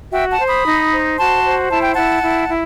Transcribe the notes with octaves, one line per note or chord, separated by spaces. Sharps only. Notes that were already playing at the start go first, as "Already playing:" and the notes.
F#4 E5 G5
F#5 A5
C5
B5 D#6
D#4
C5
F#4 A5 C6
C5
E4 A5
G5
E4 F#5 A5
E4
E4